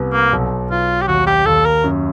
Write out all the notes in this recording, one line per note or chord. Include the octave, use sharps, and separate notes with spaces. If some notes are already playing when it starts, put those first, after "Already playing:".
Already playing: C2 B3
A#3
B1
B1 F4
G4
D#2 F#4
G4
D#2 A4
A#4
F#2